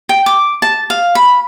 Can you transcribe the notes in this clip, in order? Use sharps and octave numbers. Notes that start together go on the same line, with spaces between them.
G5
D6
A5
F5
B5